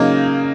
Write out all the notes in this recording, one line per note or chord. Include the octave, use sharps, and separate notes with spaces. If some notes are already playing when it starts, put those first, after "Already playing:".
Already playing: C#3 F#3 A#3 D#4